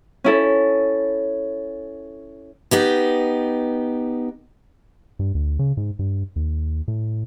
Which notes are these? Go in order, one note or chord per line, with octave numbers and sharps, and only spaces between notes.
C#4 E4 A4
B3 D#4 G4
G2
D2
C#3
G#2
G2
D#2
A2